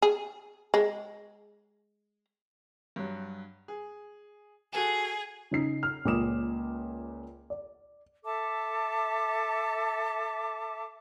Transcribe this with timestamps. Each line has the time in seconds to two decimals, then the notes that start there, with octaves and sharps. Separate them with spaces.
0.02 G#4
0.74 G#3
2.96 G2 F#3
3.68 G#4
4.73 F#4 G#4 A4 G#5
5.51 C#3 D#4 C7
5.83 F6
6.05 C#2 A#2 C#4 D6 D#6 E7
7.50 D5
8.24 A4 E5 A5 D6